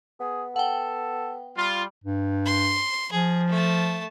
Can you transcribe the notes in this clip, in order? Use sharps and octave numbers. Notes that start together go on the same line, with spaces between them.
B3 G#4
A4 F#5 G5
G3 F4
G2
C6
F3 G#4
A3 A5